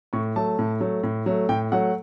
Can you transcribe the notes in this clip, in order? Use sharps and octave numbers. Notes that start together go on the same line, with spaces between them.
A2 C#6
F#3 A3 A5
A2
F#3 A3
A2
F#3 A3
A2 G5
F#3 A3 F#5